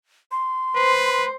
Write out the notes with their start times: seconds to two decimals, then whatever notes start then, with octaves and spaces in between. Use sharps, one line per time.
0.31 C6
0.75 B4 C5